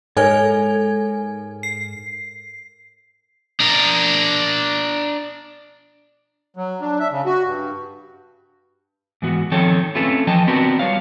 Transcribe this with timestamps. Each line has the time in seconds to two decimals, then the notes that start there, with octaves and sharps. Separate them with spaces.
0.17 G#2 A4 A#4 C#5 G#5 G#6
1.63 C7
3.60 D4 A#4
6.57 F#3
6.81 D4
7.00 E5
7.12 C#3
7.25 F#4
7.45 G2
9.22 G#2 E3 B3 F#4
9.51 D#3 F3 C4 A4 C#5 G5
9.95 A3 C4 C#4 F4 A4 B4
10.27 E3 F3 D#5 G5 A5
10.47 B3 C4 D4 F#4 A#4 B4
10.79 G3 F4 C#5 F5